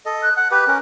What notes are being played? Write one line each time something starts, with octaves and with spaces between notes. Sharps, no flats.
A4 D#5
F#6
F#5 F#6
G4 B4 F#6
C#4 A#4